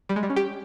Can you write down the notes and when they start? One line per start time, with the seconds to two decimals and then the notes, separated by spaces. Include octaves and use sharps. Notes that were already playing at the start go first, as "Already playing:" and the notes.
0.09 G3
0.16 G#3
0.23 G3
0.30 C#4
0.36 G4